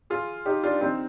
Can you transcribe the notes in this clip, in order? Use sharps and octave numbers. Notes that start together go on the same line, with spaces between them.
F4 G#4
D#4 G4
D4 F4
C4 D#4